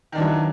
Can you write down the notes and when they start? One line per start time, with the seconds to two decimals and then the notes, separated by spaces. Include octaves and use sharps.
0.12 D#3
0.15 D4
0.18 E3
0.20 F#3